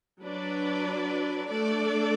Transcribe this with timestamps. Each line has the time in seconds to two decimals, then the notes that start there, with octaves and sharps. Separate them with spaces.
0.22 F#3 D4 B4 D5
1.48 A3 D4 A4 D5